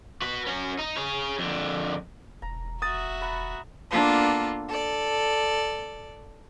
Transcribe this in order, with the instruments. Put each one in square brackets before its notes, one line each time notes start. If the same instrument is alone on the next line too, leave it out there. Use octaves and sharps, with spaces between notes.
[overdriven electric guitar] F#4 B4
C#4 F#4
D#4
G#4 C#5
F2 D3
[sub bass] E1 [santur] A#5
[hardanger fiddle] F#4 E5 [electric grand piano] D#6 A6
[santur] F#5 A#5 B5
[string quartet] A#3 B3 D4 F4 A4
A4 D5